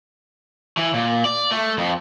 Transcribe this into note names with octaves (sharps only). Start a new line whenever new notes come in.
E3
A#2
D5
A3
F2